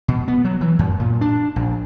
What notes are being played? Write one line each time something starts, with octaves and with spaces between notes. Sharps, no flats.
B2
B3
F#3
E3
F#2
A#2
D4
A#1